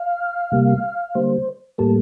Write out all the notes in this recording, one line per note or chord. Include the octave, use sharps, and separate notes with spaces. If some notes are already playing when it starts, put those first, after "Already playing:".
Already playing: F5
C3 G3 A#3
D3 G3 A#3 C5
A2 G3 A#3 A4